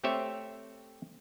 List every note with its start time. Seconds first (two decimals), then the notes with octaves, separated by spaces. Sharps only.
0.04 A3 C4 G4 C5 C#5 E5